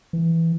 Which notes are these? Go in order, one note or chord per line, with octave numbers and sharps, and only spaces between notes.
E3